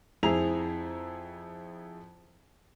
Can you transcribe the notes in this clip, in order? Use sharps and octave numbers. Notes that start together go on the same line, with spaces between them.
F2 C4 E4 G#4 A#5 F7